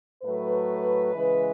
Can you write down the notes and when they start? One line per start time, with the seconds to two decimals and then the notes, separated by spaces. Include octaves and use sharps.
0.22 A2 F#3 A3 B4
1.14 C#3 E3 G#3